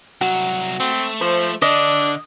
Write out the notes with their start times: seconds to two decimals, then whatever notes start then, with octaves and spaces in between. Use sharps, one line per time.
0.21 C2 F#3 F#4
0.80 A3 C4
1.21 F3 C5
1.62 D3 D4 D#5